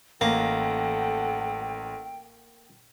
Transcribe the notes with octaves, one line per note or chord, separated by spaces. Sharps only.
A1 A#3 A4 F#5 G5 A#6